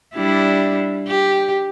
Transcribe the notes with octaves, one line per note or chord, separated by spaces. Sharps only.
G3 D4 E4
G4